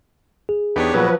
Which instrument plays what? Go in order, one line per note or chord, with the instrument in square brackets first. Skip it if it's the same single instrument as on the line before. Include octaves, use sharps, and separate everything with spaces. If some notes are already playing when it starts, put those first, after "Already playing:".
[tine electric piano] G#4
[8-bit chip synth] E2 D4 C#5 [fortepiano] B3 D#4 G4
[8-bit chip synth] A#2 [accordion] F3 B4 [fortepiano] F#3 F#4